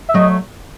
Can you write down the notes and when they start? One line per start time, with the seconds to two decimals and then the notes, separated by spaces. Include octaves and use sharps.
0.09 E5
0.14 F#3 A3 D#5